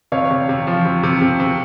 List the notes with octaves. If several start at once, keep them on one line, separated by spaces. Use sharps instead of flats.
C3 C#5 F5
C3
C3
F3
C3
C3
C3
C3